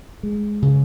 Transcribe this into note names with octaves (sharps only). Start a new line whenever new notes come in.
G#3
C#3